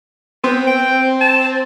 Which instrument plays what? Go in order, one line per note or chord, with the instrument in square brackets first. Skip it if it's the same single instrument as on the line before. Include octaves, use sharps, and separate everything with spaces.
[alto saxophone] B3 [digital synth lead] C4
[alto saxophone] G5
A5